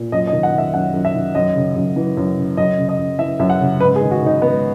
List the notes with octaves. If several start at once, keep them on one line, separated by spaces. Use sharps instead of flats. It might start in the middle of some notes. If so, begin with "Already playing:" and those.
Already playing: A#2
F#2 D#5
D#5
D#3
F#5
D#3 E5
F#2 F#5
F#2
E5
D#3
F#2 D#5
C#3
F#2
E3
F#2
C#3
F#2 D#5
C#3
D#5
F#2
E3 E5
F#2 E5
F#5
C#3
G#2 B4
G#4
D#3
F#4
D#3
D#4
G#2 B3